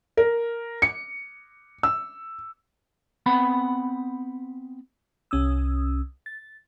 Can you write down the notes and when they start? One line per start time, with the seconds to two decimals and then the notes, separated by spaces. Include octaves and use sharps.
0.17 A#4
0.82 C#7
1.83 E6
3.26 B3 C4 F#5 B5
5.31 C2 C#4 D#6 E6
6.26 A6